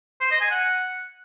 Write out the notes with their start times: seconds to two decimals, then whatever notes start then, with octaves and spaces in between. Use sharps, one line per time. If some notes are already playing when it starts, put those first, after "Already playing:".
0.21 C5
0.31 D#5
0.41 G#5
0.51 F#5